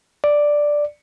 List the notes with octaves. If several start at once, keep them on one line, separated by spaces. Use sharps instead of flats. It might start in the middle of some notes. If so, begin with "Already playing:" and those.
D5